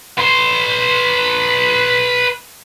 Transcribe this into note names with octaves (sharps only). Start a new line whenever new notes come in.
B4 C6